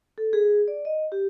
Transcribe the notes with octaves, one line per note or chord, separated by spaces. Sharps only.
A4
G#4
D5
D#5
G4